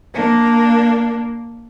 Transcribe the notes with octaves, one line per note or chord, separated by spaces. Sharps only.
A#3 D4